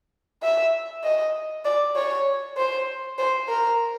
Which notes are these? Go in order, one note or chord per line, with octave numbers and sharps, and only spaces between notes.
E5
D#5
D5
C#5
C5
C5
A#4